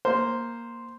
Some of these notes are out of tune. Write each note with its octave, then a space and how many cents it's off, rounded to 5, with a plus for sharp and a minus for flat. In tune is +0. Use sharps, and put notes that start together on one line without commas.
A#3 +0 C5 +0